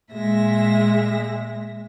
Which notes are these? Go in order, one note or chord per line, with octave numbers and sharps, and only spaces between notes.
A#2 G#3 E5 A#6